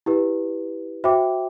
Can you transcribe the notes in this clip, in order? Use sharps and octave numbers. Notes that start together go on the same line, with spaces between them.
E4 G4 B4
F#4 C5 E5 G5 D6